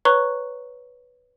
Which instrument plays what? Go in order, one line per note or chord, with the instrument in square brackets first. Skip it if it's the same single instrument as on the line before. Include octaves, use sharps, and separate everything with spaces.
[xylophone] B4 C#5 A#5 C#6 F#6 G7